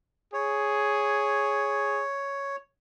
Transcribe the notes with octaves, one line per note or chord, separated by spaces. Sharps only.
G#4 C#5